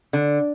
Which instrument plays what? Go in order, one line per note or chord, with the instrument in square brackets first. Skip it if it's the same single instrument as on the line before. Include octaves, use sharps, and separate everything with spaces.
[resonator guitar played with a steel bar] D3